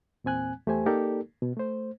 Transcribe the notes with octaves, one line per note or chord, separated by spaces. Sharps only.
E2 A#2 C4 G#5 F#6
E2 A3 G4 C5 G#5
A#3 D#4 G4 A4 A#4 D5
B2
A3 C5